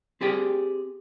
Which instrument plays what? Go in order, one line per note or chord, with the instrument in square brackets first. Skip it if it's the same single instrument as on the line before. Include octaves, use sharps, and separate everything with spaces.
[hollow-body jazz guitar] C4 G4 G#4 D5